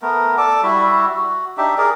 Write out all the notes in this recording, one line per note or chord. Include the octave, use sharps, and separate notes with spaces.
A3 B3 A#4
A4 D5 A5 D6
G3 E4 F#4 E5
F#4
D4 D#4 G4 E5
G#4 A#4 D5